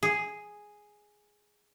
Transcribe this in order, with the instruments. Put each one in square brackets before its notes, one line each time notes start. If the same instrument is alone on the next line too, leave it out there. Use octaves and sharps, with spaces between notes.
[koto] G#4